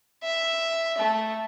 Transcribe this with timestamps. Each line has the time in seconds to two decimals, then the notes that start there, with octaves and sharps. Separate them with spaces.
0.24 E5
0.98 A3